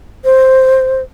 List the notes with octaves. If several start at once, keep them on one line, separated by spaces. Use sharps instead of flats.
C5